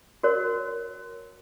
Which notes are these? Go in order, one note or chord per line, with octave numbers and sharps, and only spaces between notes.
F#4 A#4 C#5